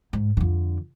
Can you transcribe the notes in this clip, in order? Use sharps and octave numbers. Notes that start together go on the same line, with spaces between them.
G#2
F2 D3